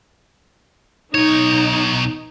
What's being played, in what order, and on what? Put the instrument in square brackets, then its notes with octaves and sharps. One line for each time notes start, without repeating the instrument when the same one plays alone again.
[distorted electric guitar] B1 C#5 [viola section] D#4